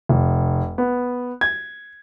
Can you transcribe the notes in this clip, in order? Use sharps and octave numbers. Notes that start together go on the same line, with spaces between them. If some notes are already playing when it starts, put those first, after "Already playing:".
F1
B3
G#6